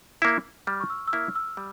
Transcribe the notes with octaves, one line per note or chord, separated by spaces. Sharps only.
A#3 E4
G3 F6
C#6
E6
E6
A#3 E4 F6
E6
G3